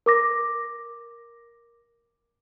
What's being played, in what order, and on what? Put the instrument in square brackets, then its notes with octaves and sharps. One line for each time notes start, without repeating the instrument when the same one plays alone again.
[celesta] A#4 D6 A#6